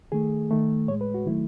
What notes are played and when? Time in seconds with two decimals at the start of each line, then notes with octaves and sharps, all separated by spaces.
0.12 D#3 A3 G#4
0.50 D#3 A3
0.88 A2 C#5
0.91 G#3
1.01 B4
1.14 F#4
1.26 D#3 F#3 A3 E4